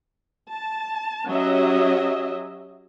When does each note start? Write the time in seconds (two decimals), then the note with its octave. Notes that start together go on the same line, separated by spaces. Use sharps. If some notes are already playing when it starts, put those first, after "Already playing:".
0.50 A5
1.29 F#3 C#4 G4 D#5 E5